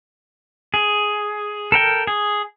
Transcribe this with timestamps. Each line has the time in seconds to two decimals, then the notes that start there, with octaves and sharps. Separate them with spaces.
0.74 G#4
1.72 A4 A#4 G5
2.07 G#4